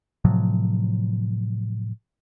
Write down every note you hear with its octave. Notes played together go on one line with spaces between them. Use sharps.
A2 C3 F3 F#3